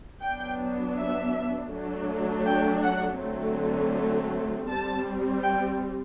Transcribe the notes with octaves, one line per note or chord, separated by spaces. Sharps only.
F#3 B3 D4 G5
E5
F#3 A3 D4
G5
F#5
D3 F#3 A3 C4
G3 C4 A5
G5